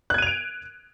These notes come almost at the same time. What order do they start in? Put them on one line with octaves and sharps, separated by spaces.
F#6 G#6 D#7 F7 D7